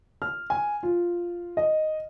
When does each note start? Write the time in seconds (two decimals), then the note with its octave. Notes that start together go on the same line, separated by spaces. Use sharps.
0.22 F6
0.50 G#5
0.83 F4
1.57 D#5